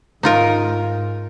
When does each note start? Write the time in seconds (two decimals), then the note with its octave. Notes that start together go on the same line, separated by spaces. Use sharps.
0.23 G#2 D#4 F4 A#4